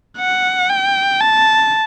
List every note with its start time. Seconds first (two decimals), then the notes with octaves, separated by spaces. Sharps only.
0.18 F#5
0.70 G5
1.21 A5